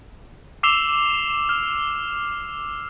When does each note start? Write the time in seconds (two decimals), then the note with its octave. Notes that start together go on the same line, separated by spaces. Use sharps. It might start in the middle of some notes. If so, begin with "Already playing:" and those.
0.63 D6 E6 C7 E7 F7 G7
1.49 F6